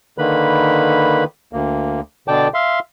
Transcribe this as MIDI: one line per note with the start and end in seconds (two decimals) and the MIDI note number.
0.18 1.24 50
0.18 1.24 51
0.18 1.24 58
0.18 1.24 71
0.18 1.24 83
1.53 2.01 38
1.53 2.01 58
2.28 2.48 47
2.28 2.48 50
2.28 2.48 74
2.28 2.48 79
2.28 2.48 81
2.28 2.48 86
2.54 2.79 76
2.54 2.79 77
2.54 2.79 84